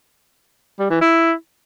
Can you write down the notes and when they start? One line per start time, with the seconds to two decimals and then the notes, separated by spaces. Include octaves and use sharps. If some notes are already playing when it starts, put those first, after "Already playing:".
0.79 G3
0.90 E3
1.01 E4